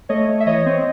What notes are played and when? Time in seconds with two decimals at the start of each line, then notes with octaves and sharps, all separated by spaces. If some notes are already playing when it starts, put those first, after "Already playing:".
0.09 A3 C#5 D#5
0.29 A3
0.40 E5
0.47 E3 C#5 D#5
0.66 C4